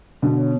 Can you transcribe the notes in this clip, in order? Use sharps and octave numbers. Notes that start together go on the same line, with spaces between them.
B2 D3 B3
C#5